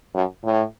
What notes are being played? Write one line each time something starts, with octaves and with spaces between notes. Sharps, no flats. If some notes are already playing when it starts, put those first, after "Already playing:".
F#2
A2